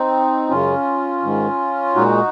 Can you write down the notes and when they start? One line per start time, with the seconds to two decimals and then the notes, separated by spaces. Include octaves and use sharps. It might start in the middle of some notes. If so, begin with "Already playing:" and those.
Already playing: C4 D#4
0.49 F#2 C#3 G#3 C#4 F4
1.22 G#2 D#3 G#3
1.95 A#2 G#3 D#4 F#4